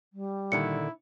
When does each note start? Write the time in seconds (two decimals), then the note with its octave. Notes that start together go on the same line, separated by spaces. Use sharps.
0.13 G3
0.52 A#2 D3 D#3 E4 C#7